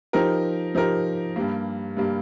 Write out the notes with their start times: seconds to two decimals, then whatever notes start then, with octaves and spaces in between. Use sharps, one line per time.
0.13 F3 D#4 G4 A#4
0.75 F3 D#4 G4 A#4
1.36 G2 G3 A#3
1.97 G2 G3 A#3